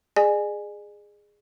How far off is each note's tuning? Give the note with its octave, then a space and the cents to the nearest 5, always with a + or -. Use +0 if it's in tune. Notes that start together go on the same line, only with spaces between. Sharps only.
G#4 -5 D5 +45 G#5 +0